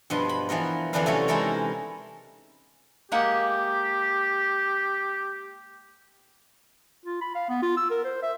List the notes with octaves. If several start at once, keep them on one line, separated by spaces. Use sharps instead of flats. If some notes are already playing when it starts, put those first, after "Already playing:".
G2 B2 F3 B4 C6
B5
E3 F3 B3 A#4
F2 D3 E3 D4 B4 F5
C3 E3 F#3 A3 C#4 A4
E3 G#3 D#4 E4 A4 A#4
G#3 A#3 G4 F#5
F4
B5
F5
B3
F4
E6
A#4
C5
E5